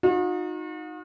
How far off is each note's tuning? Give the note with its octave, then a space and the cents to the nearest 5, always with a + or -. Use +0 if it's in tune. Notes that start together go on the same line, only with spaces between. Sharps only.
D#4 +0 F#4 -45